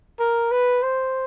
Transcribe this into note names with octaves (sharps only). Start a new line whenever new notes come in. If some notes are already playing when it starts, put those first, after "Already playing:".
A#4
B4
C5